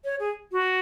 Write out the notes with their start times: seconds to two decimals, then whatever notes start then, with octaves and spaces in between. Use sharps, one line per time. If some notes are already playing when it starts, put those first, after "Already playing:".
0.04 C#5
0.20 G#4
0.52 F#4